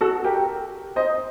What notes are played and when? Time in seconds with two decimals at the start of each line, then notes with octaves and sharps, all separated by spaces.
0.01 F#4 A4
0.24 G4 A#4
0.96 C5 D#5